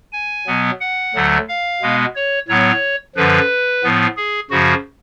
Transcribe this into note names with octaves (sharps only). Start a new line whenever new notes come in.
G#5
B2 F#3 B3
F#5
D2 D3 F#3 A3
F5
B2 G#3 B3
C#5
A2 F#3 B3 C#5
F#2 D3 F3 B4
A2 F3 B3
G#4
F#2 C#3 F3 F#4